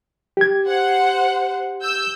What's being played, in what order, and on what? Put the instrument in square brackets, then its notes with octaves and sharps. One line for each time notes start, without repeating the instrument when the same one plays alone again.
[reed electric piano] G4 G#6
[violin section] C5 F#5
E6 G6